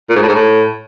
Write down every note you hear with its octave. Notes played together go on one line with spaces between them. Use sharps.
A#2
G#2
A2
G#2
A2